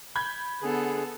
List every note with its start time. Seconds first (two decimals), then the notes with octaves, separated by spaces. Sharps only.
0.15 B5 G6 G#6
0.62 D3 B3 G#4 A4